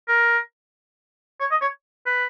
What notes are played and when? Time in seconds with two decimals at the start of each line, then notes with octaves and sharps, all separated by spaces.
0.08 A#4
1.40 C#5
1.51 D#5
1.62 C#5
2.06 B4